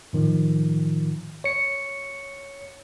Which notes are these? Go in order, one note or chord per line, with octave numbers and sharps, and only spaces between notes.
A2 D#3 F3
C#5 C#7